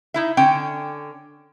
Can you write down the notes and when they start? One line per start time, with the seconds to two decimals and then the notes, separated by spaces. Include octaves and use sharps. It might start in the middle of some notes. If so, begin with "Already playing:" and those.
0.14 D#4 E4 E5
0.37 D3 C#4 G5